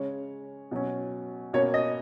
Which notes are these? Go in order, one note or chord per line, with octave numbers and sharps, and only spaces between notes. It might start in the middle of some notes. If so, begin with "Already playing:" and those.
Already playing: C#3 G#3 C#4 C#5
B2 F#3 C#4
B2 A#3 C#4 C#5
D#5